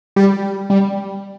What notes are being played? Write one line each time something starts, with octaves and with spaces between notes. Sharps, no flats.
G3
G3